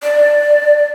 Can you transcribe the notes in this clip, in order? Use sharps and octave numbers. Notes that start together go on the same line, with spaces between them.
D5